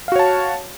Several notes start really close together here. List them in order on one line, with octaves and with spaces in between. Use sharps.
F5 F#4 C#5 A5